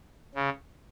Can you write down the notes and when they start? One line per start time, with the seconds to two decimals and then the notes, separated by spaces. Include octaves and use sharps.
0.35 C#3